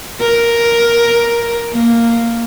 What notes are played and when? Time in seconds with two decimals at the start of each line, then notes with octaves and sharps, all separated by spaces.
0.21 A#4
1.73 A#3